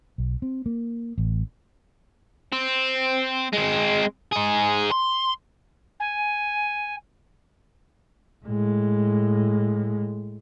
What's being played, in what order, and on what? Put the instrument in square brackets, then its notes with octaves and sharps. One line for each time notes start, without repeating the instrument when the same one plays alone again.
[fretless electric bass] B1
C4
A#3
A1
[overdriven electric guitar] C4
G#3 C4
D#4 G#4
C6
[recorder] G#5
[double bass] A2 G#3